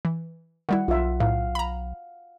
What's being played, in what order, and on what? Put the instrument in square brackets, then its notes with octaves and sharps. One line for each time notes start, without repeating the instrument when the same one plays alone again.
[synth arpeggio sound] E3
[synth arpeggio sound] D#3 G3 E4 [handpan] F#5
[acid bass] B1 [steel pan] F4 E5
[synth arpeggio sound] A2 [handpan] F5
[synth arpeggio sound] A#5 B5